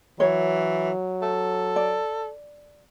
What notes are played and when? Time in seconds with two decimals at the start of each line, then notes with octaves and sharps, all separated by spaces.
0.20 E3 F#3 C#5
1.22 A4
1.76 D5